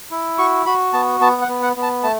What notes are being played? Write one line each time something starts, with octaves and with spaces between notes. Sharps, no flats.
E4
F#4 C#6
F#4 B5
B3 A5
B3 A5
F#5
B3
F#5
B3
A5
A3 A5